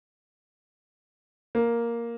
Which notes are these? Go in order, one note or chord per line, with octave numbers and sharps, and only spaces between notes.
A#3